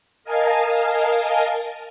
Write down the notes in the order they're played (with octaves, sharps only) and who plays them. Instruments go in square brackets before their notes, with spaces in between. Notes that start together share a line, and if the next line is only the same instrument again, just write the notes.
[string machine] A#4 D#5 F5 G#5 A5